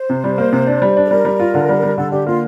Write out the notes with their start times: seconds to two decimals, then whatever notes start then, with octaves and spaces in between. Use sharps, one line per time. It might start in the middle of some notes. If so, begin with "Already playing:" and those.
Already playing: C5
0.10 C3
0.24 G3
0.38 A#3
0.52 C3
0.67 D4
0.82 G3
0.97 D4
1.05 A4
1.10 G3 A#4
1.25 G3
1.40 F4
1.54 D3
1.69 G3
1.83 G3
1.97 D3 A4
2.11 D3 G4
2.26 A#3 F4